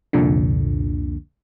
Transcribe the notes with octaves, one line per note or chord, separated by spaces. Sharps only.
C2 F2 A#2 D3